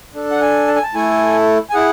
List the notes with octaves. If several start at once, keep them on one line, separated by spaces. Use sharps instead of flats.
D4 A4
F#5
G#5
A5
G#5
A5
A3 E4 A4 G#5
G#5
E4 G#4 F#5